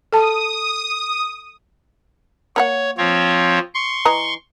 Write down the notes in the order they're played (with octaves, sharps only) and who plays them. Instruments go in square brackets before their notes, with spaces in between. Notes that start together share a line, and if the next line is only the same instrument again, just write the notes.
[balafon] A4 A5 [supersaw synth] D#6
[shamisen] A#3 A#4 F#5 [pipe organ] C#5
[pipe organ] F3 C4 C#5
C6 C#6
[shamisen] E3 D#5 A#5